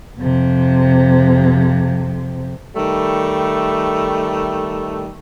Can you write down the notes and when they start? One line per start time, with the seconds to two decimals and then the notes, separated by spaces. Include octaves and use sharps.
0.19 F2 C3
2.76 D#3 G3 A3